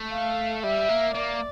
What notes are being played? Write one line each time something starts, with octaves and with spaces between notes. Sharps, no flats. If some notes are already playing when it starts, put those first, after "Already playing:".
Already playing: A3
F5
G3 E5
A#3
A#3 D5